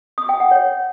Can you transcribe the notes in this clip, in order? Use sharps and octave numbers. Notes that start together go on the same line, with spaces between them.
D#6
G5
F#5
C#5